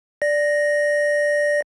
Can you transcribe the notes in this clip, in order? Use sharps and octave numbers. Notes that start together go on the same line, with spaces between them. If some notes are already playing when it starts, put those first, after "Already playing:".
D5 A#6